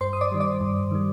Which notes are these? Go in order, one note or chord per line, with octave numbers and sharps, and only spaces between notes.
G2 C5 C6
D#6
D5 D6
D#3 G3
D5 D6
G2
D#3 G3